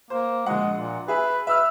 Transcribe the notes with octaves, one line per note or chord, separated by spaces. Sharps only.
A#3 C5
A#1 G#3 F#5
A#2
G#4 B4 E5
B4 E5 E6 F6